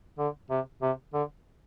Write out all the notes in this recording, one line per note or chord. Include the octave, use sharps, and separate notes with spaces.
D3
C3
C3
D3